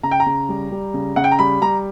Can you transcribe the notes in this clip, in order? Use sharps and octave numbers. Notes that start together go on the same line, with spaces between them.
C#3 A#5
G5
A#5
C#3
G3
G3
C#3
C#3 F#5
G5
A#5
G3 B5
G3 A#5